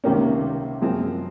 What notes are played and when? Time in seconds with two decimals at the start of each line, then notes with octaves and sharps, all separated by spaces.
0.04 C#2 C3 D#3 A#3 C#4
0.82 F#2 F3 G#3 C4 F4